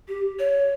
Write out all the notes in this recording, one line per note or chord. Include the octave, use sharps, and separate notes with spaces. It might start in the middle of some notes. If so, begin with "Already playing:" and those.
G4
C#5